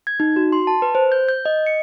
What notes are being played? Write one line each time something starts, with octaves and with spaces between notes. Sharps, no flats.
G#6
D#4
F#4
C6
A5
B4
C5
G6
G6
D#5
C#7